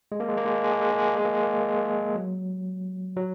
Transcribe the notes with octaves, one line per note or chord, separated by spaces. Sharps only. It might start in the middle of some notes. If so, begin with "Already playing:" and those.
G#3
A#3
G#3
A#3
G#3
A#3
G#3
A#3
G#3
A#3
G#3
A#3
G#3
A#3
G#3
A#3
G#3
A#3
G#3
A#3
G#3
F#3
F#3